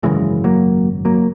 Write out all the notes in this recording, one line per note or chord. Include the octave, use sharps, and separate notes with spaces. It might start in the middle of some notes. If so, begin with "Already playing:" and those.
G#1 F#2 C#3 E3 G#3
F#3 A#3
F#3 A#3